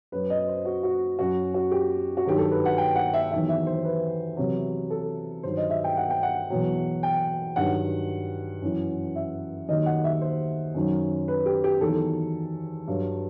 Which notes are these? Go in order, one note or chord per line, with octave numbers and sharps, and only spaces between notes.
F#2 F#3 B4
D#5
C5
F#4
F#4
F#2 F#3 F#4
F#4
G4
F#4
G2 D#3 F#3 G4
A4
B4
F#5
G5
F#5
E5
E2 D#3 F#3 E5
E5
C5
B4
E2 C3 F#3
A4
G2 D#3 F#3 C5
D#5
E5
G5
F#5
G5
F#5
E2 B2 F#3
G5
G2 D#3 F#3 F#5
F#2 E3
E5
D#2 D#3 F#3 D#5
F#5
E5
C5
F#2 D#3 F#3
B4
G4
G4
E2 D#3 F#3 A4
G2 F#3